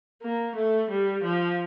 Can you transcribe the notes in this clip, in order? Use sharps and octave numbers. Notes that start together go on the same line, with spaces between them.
A#3
A3
G3
F3